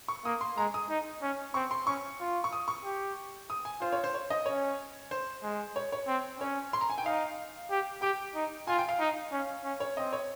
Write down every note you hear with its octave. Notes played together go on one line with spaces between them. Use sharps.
C#6
A#3 D#6
C6
G#3 A#5
D#6
D#4
C#4
C4 C#6
C6
C#4 C#6
F4
C#6
D#6
C#6
G4
D#6
G#5
F4 C5
C#5
C5
C#5
D#5
C#4 C#5
C5
G#3
C#5
C#5
C4
C#4 C#5
C6
A#5
G#5
G5
D#4 F5
G4
G4 G5
D#4
F4 G#5
G5
F5
D#4
C#4
C#4
C#5
C4 D#5
C#5